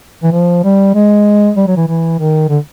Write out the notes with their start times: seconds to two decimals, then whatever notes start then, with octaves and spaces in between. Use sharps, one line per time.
0.23 E3
0.32 F3
0.64 G3
0.95 G#3
1.57 G3
1.67 F#3
1.77 E3
1.88 E3
2.19 D#3
2.49 D3